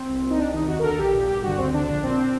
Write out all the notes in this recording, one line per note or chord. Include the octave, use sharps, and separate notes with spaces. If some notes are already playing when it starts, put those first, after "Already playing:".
Already playing: C4
C2
A#2
D#4
C2 D4
C3 D#3 D#4
D#2 F#4
A#4
D3 A4
A#1 G4
A#2
G1 G4
G2 D3 F#4
D2 C4
D3 D4
A#1 D4
A#2 C4
C4